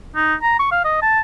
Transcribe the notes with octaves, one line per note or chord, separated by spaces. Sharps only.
D#4
A#5
C#6
F5
D#5
A5